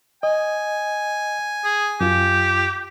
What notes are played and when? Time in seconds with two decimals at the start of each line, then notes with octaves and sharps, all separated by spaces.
0.23 D#5 G#5
1.65 G#4
2.01 F#2 F4 G4